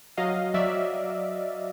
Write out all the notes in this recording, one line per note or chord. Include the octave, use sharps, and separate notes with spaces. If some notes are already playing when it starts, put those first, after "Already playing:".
F#3 D#5 F5
F#3 D5 E5